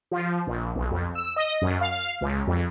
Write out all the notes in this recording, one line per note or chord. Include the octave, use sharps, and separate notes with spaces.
F3
A#1
B1
F2
E6
D#5
F#2
F5
C#2
F2